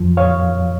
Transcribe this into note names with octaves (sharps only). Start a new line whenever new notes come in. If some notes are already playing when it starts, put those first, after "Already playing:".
Already playing: F2 F3
C#5 F5